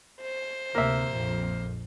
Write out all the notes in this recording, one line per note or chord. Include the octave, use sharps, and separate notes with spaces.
C5
D2 C3 A#3 E5
A#1 F2